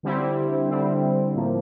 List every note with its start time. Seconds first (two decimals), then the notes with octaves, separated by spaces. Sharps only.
0.03 D3 G3 C4 E4
0.69 D3 G3 C4 E4
1.35 A2 F3 A#3